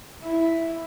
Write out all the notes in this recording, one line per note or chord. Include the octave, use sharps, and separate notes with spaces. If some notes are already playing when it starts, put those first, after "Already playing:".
E4 E5